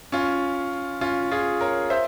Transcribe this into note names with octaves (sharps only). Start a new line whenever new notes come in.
C#4 F4
C#4 F4
F4 G#4
A#4 C#5
C5 E5